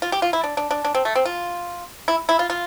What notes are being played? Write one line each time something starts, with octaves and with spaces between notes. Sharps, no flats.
F4
G4
F4
E4
D4
D4
D4
D4
C4
A3
C4
F4
E4
E4
F4
F4